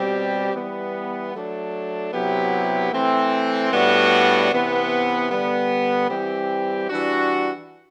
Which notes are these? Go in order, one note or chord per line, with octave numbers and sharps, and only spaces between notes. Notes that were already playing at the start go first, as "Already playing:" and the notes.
Already playing: B2 G3 C4 G4
E3 G3 B3
F#3 A3 D4
C3 F#3 B3 E4 G4
E3 A3 C4
A2 G3 B3 D4 F#4
C3 E3 B3
D3 G3 B3
E3 G3 C4 G4
E3 G3 D4 F#4